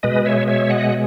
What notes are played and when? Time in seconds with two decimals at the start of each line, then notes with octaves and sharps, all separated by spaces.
0.03 B2 G#3 B4 D#5
0.26 C#5 E5
0.48 C#5 E5
0.70 D#5 F#5